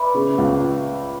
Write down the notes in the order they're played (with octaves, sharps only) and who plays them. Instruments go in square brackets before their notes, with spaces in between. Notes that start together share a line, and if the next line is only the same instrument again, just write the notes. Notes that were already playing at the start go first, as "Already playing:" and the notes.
Already playing: [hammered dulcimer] B4 D5 E5
[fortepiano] C#3
C#2